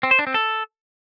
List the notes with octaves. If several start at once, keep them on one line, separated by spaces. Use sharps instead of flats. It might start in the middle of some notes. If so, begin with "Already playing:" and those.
C4
C5
D4
C4
A4